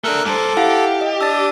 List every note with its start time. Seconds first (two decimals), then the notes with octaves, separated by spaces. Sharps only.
0.04 A3 D4 A#4 E6 F#6
0.25 G2 A4 C5 D6
0.57 E4 G4 F5 F#5
1.01 D#5
1.21 D4 D#6 E6 A6